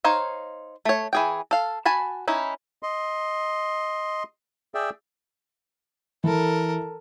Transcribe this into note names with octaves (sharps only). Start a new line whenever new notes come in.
D#4 C5 C#5 F5
A3 C#5
E3 G#4 G5
A4 F5
F#4 G#5 A5 B5
C#4 D#4 E4
D#5 C6
G#4 D5 E5 G5
E3 A4 A#4